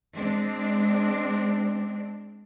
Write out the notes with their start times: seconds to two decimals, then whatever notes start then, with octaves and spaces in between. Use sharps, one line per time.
0.13 G#3 C4 D4